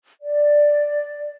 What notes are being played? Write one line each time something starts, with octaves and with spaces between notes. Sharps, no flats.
D5